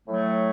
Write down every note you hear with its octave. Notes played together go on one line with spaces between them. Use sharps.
A2 F#3 A3